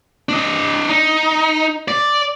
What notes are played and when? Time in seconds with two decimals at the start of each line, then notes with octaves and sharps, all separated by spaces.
0.29 D4 D#5
0.89 D#4
1.88 D5